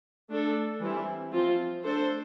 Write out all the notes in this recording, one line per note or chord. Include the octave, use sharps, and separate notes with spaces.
A3 D4 A4
E3 G3 C4 E4
F3 C4 F4
A3 D4 A4 C5